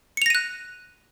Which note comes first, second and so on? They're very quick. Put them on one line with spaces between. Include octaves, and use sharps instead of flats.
C#7 F7 A#6 D#7 F#6